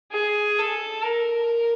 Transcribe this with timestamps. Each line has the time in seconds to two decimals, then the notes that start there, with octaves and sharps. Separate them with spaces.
0.12 G#4
0.59 A4
1.03 A#4